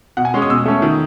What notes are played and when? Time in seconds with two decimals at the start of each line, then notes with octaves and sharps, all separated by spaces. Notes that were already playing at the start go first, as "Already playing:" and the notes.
0.17 B2 F#5
0.25 G#5
0.34 G#3 C#4
0.42 D#6
0.50 B2 E6
0.66 A3 C#4
0.82 D#3